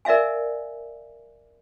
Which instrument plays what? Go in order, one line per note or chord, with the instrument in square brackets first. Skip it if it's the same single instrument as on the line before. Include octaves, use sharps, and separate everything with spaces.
[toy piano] A#4 D5 E5 F5 G#5